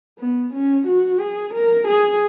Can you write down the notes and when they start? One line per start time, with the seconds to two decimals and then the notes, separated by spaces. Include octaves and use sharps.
0.19 B3
0.53 C#4
0.87 F#4
1.20 G#4
1.54 A#4
1.88 G#4